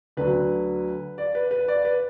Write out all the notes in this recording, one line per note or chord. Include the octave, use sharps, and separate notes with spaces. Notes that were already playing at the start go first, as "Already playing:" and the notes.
D2 D3 F#3 B4
D5
B4
B4
D5
B4